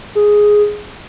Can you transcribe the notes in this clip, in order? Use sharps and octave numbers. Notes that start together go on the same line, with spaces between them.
G#4